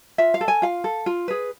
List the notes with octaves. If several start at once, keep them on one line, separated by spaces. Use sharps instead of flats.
F4 E5
F5
A4
G#5
F4 F5
A4
F4
G#4 B4